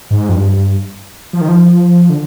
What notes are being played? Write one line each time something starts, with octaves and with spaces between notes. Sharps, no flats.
G#2
F2
G2
F3
D#3
F3
D3